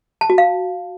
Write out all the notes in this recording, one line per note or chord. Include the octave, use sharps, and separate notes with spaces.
A5
F#4
F5